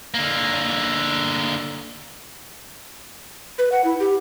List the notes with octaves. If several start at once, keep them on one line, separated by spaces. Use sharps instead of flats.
D3 A#3
B4
F#5
E4
G4